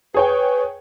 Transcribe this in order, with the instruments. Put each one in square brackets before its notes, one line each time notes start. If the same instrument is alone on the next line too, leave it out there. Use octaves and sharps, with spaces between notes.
[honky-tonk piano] G#4 C#5 G5 [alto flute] B4